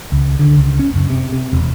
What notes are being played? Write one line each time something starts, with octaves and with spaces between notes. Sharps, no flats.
C#2
D3
C#2
C#4
F#1
C3
C3
E1